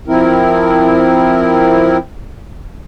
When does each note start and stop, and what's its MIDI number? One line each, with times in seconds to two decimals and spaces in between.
0.08 1.98 53
0.08 1.98 60
0.08 1.98 64
0.08 1.98 70